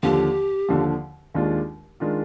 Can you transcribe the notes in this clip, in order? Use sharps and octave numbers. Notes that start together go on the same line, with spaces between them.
D#2 D3 F3 G4
D#2 D3 F3
D#2 D#3 G#3 D4 F4
D#3 G#3 D4 F4